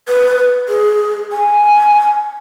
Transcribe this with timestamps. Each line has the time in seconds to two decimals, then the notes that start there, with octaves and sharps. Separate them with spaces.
0.08 B4
0.68 G#4
1.32 G#5